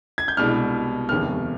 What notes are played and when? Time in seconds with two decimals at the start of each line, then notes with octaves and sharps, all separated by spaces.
0.18 G#6
0.28 G6
0.37 C2 B2 G#3 D4 F6
1.09 F1 D#2 D#3 G#3 B3 F6